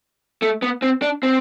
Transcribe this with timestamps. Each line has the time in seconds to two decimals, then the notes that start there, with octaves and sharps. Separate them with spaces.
0.42 A3
0.62 B3
0.82 C4
1.02 D4
1.23 C4